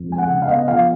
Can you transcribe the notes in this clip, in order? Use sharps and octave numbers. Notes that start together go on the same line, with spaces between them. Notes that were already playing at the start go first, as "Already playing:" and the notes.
Already playing: F2
G#3 G#5
F#5
C#3
F5
B3 D#5
F3 F5